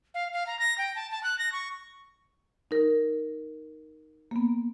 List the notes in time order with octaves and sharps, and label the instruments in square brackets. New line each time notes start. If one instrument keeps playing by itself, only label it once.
[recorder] F5
F5
A#5
A#6
G5
A5
A5
F#6
A#6
C#6
[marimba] D#4 A#4
A#3 B3